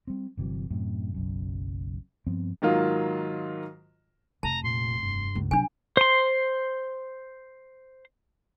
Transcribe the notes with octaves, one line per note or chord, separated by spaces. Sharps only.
G3 C4
G1 C3 E3 F#3
F#2 A2 C3
F#1 B1 F#2
G2 F3 B3 C4
G#2 D#3 F#3 A#3 F4
F1 A5 A#5
A#2 C6
G2
C#2
C3 F#3 D4 G#5
C5 C6